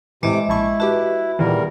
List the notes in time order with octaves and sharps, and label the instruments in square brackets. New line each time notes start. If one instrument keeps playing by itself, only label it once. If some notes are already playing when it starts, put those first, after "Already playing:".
[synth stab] A2 E3 [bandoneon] C3 D6 [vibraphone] G#3 D#5 E5
[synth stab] A#1 A5 C#6 [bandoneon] E4
[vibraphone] F#4 E5 [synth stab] G4 B4 A5
[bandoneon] E2 G3 A#4 [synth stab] A#2 D#3 E3